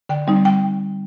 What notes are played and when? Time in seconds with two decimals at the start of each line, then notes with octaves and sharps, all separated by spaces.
0.09 D3 G5
0.27 G3 C4 D#4
0.45 G5